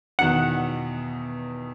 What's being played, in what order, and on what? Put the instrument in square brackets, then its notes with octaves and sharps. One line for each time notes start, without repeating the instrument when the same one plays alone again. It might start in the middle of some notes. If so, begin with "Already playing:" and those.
[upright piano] E2 B2 D#3 [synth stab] F#5